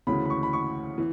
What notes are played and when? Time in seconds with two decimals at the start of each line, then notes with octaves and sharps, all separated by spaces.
0.07 D2 C#3 E3 B5
0.25 B5
0.30 C#6
0.43 B5
0.53 C#6
0.98 E3